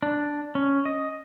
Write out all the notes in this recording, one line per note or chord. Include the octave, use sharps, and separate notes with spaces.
D4
C#4
D#5